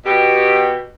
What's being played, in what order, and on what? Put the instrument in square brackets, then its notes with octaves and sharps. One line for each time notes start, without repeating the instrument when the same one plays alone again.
[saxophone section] B2 G4